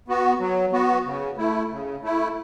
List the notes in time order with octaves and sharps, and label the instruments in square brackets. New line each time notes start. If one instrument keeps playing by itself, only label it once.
[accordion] B3 F#4
F#3
B3 F#4
C#3
A3 E4
C#3
A3 E4